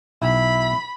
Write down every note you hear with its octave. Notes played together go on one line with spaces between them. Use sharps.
B1 E4 B5